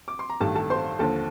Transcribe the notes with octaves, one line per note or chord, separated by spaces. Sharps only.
D6
C6
A#5
A1 G2 D#3 G3 A4 A5
A4 A5
C5 C6
D#2 D3 F3 A4 A5